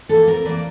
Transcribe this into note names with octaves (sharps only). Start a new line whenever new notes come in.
E3 A#3 A4
F2 A#4
E3 A#3 D5